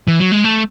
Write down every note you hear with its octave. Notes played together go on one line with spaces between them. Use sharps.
E3
F#3
G#3
A3